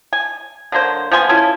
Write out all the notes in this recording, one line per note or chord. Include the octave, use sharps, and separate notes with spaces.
G#5
D3 F#3 A#3 C5
F3 B3 G#5 C6
C#4 E4 F4 A4